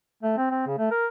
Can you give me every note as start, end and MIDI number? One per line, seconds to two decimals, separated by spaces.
0.23 0.34 57
0.37 0.47 60
0.51 0.66 60
0.67 0.76 49
0.78 0.89 57
0.91 1.06 70